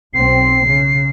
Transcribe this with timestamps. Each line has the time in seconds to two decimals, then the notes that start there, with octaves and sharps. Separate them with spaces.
0.14 B1 C4 C7
0.67 C#3